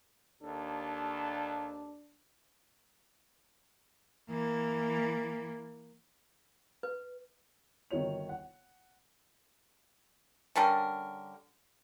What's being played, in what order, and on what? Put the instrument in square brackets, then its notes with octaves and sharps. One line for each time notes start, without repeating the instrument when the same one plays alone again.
[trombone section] D#2 A4 [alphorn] D4
[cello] E3 A#3
[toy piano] B4
[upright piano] G1 D#3 F#4 C#5 F7
F#5
[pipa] D3 G3 C#4 A#4